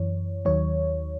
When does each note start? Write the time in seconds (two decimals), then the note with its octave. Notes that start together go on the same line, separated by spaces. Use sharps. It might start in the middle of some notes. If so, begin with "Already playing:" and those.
Already playing: F#2 E3 C#5
0.45 D#2 D#3 F#3 C#5